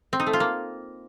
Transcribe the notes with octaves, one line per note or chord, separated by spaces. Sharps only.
C4
D#4
A3
F4
A#3